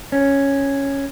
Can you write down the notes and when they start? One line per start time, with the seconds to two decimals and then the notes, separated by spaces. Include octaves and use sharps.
0.12 C#4